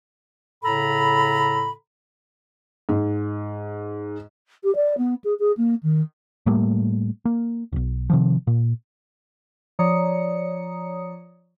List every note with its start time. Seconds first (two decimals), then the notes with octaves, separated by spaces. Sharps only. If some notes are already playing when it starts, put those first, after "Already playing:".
0.63 A2 C#3 A4 A#5 B5
2.89 G#2
4.63 G4
4.75 D5
4.97 B3
5.24 G#4
5.39 G#4
5.57 A#3
5.82 D#3
6.46 A2 G3 A3 A#3
7.25 A#3
7.73 D#1 B1
8.10 C3 D#3 F3
8.47 A#2
9.79 F3 C#5 D5 A#5 D#6 C#7